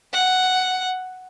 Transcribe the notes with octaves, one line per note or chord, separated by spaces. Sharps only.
F#5